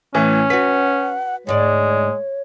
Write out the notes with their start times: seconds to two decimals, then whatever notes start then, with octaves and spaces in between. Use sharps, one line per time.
0.14 A2 E3 C#4
0.50 F#4 B4 F#5 B6
1.47 D2 G#2 G#3 C#5 D5